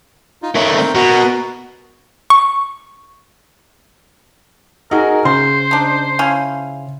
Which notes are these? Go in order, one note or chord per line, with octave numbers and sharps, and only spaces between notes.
D#4 F4
D#3 A3 C#5
C4 A#4 G5
B2 F#4 A#4
C#6
D#4 F#4 G#4 A#4
C#3 C5 C6
D4 D#4
F3 C#4 E4